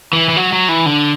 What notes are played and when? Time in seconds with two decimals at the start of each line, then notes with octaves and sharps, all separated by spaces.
0.13 E3
0.29 E3
0.37 F#3
0.53 F#3
0.69 E3
0.86 D3